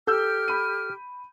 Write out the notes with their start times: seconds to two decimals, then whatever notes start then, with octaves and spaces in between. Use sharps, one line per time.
0.07 G4 A4 E6 F6 G6
0.48 B5 D#7